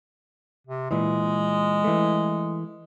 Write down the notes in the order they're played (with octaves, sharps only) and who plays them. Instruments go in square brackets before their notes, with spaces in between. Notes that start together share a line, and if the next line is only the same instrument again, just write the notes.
[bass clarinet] C3
[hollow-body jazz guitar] A#2 E3 [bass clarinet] G#3
[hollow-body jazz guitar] E3 A3